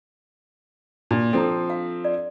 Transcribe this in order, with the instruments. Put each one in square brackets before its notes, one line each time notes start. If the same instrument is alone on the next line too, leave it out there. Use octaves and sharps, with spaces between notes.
[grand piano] A#2 [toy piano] D4 G4
[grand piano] F3 C4 [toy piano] A4 C5 A#5
[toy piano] F5
D5